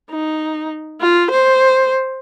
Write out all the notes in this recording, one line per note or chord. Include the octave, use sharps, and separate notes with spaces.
D#4
F4
C5